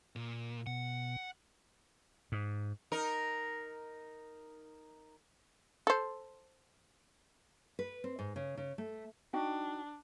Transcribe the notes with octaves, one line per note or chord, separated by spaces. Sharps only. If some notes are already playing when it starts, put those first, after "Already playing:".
A#2
B2 F#5
G#2
D#4 A#4
A4 C5
B4
C4
G#2
C#3
C#3
A3
D4 D#4 F#4 G5